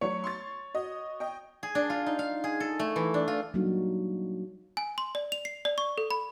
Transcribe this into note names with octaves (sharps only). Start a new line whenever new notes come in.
F#3 A3 C#5 C#7
C6 C#6 A6
F#4 D#5
D#5 G5
G#4
D4
F4
D#4
F5
G#4
A4
A3
E3
D4
F4
F#3 G3 A#3 D4 D#4 F#4
G#5
C6
D5
F7
C7
D5
C#6
A4
B5